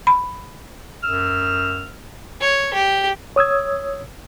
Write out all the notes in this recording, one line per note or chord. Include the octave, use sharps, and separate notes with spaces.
B5
F#2 E6 F6
C#5
G4
C#5 D#6 E6 G#6